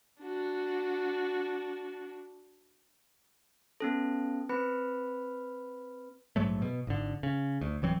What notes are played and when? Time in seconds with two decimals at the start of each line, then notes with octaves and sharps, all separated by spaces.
0.22 D4 F#4
3.80 B3 C#4 A4
4.49 C4 B4 B5
6.36 A#1 G#2 F#3 A3
6.62 B2
6.87 G#1 D3
7.23 C#3
7.61 D2
7.82 D1 E3 F#3 C4